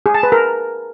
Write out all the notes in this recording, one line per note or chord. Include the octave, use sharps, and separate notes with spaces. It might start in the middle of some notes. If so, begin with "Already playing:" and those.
G#4
A5
B4
A#4